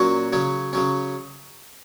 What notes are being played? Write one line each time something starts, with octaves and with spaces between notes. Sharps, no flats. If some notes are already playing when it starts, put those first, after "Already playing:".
Already playing: A#2 F#3 C#4 F#4
C#3 F#3 C#4
C#3 F#3 C#4